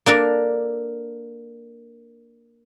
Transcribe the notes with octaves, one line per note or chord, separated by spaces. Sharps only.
A#3 D4 A4 A#4